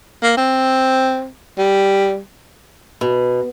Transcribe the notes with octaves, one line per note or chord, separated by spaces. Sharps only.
A#3
C4
G3
B2